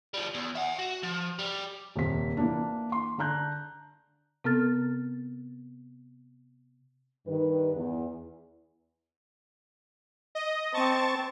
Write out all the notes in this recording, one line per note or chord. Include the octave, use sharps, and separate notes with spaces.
F3 G3
E2
E5 F#5
F#4
F3
G3
D#1 C3 B6
E3 A#3 D4
C6
D3 D4 A#5 F#6 G6
C3 B3 C4 A4 F6 A6
G2 D#3 B4
E2
D#5
C4 A5 C#6 A6